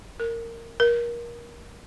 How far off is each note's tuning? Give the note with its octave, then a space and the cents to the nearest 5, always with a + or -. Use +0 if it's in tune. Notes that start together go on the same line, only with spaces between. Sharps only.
A#4 -15
A#4 +25